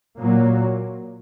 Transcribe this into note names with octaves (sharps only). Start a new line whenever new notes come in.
A#2 F#3 A#3